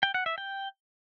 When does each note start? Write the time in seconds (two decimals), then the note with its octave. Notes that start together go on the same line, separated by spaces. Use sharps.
0.03 G5
0.14 F#5
0.26 E5
0.38 G5